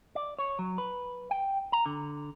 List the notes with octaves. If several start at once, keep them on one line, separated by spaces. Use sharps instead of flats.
D5
C#5
F#3
B4
G5
A#5
D3